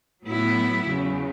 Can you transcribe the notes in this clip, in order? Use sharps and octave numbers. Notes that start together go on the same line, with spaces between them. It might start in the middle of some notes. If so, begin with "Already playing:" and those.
A2 F#3 B3 E4
E2 C#3 F#3